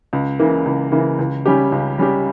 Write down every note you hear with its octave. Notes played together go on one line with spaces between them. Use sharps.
C#2
C#3 E3 A#3
C#2
C#3 E3 A#3
C#2
C#3 G3 C#4 G4
C#2
C#3 G3 C#4 G4